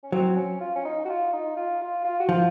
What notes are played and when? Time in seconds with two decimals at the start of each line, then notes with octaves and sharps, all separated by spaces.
0.03 C#4
0.12 F#3 C4
0.36 C#4
0.60 F4
0.76 C#4
0.85 D#4
1.05 F#4
1.09 F4
1.33 D#4
1.57 F4
1.81 F4
2.04 F4
2.20 F#4
2.29 F3 F4